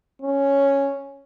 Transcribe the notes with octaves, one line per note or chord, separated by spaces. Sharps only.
C#4